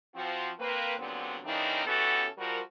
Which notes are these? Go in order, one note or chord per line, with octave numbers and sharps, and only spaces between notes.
F3 C4 F#4
A#3 C4 B4
A#2 D3 F#3 G3 B3 C4
C#3 E3 A#3 C4 D4 D#4
E3 B3 C#4 F#4 G4 A4
F3 G3 F4 F#4 A#4